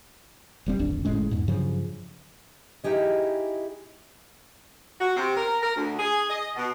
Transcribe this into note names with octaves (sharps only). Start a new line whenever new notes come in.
E1 G3 C4
D1 G#1 F2 D4
G1 A2 G#3 C#4
E2 G#2
G2 C#3 F3 F#3
D#4 E4 G4 G#4 D#5
F#4
C3
A#4
A#4
D2
G#4
D#5
B2